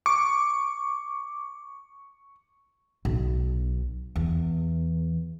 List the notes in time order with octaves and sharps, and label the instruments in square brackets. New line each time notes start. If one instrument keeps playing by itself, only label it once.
[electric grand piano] C#6 [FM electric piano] D6
[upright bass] B1
E2